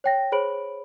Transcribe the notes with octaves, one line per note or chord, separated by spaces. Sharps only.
C#5 G5 A#6
G#4 C5 C#5 B5 D7 F#7